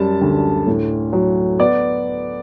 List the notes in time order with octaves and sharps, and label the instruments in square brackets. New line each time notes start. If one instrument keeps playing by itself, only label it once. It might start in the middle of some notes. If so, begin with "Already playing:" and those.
Already playing: [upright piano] F#2 G3 A5
D2
A2
F#3
B3 D5